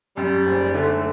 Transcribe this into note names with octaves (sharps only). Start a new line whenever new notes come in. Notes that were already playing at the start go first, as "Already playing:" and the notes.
F#2 G3
F#1
D3 A3